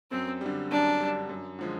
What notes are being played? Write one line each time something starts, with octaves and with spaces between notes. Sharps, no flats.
F#2 C4
D3 G3
F#2 D4
D3 G3
F#2
D3 F3 G#3